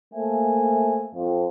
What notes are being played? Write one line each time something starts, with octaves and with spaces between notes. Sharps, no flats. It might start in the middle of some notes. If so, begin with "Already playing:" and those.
A3 A#3 C5 E5 G#5
F2